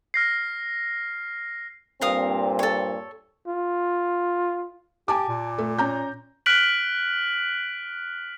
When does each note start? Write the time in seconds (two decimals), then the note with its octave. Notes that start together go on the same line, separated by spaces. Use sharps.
0.14 F6 A#6 C7
2.01 G2 A#2 C4 A#4 F5 D#6
2.59 A4 C#5
3.47 F4
5.08 G4 G#5 A5 D6
5.28 A#2
5.58 A3
5.78 C#4 A#5 G6
6.46 F6 F#6 B6 D7 F#7